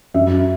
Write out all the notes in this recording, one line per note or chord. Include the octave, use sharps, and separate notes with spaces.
F#2 E5